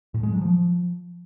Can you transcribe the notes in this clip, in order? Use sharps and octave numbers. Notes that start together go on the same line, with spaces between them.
A2
G#3
F#3
F3